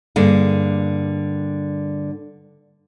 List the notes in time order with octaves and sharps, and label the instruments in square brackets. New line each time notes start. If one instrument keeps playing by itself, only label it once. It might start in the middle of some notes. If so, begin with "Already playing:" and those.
[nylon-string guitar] G2 D3 A#3 G#4